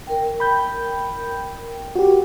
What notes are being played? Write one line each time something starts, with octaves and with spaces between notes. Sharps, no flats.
A#4 G5
B5 G6
F#4 G4